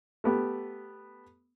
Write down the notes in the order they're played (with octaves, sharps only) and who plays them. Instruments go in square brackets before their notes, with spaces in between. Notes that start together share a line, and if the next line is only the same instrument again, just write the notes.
[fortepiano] A3 B3 G4